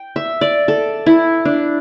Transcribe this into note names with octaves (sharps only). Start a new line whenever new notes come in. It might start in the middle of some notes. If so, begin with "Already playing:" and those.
Already playing: G5
E5
D5
A4
E4
D4